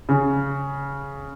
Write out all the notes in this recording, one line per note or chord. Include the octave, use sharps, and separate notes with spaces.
C#3